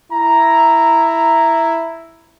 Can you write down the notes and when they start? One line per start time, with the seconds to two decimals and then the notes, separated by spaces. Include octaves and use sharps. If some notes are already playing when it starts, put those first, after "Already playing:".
0.12 E4 A#5